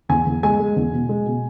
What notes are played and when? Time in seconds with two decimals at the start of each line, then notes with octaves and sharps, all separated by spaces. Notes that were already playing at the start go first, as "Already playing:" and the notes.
0.09 E2 G#5
0.26 E2
0.43 G#3 G#5
0.59 G#3
0.76 E2
0.93 B2
1.09 G#3
1.26 B2